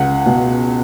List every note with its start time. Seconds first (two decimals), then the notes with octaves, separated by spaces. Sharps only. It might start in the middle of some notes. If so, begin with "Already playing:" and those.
Already playing: C#2 F#5
0.26 B2